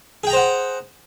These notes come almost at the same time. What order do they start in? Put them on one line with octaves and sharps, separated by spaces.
G#4 G5 A#5 C5 F#5